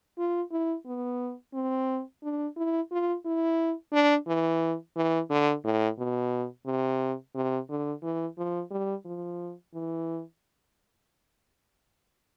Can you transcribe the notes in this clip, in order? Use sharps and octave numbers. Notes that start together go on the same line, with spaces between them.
F4
E4
B3
C4
D4
E4
F4
E4
D4
E3
E3
D3
A2
B2
C3
C3
D3
E3
F3
G3
F3
E3